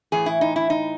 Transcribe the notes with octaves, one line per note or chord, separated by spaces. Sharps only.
A2 E3 G#4
E4
D#4
E4
D#4